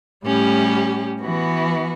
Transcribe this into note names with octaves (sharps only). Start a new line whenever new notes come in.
A2 G3 C#4 G4
E3 B3 F#4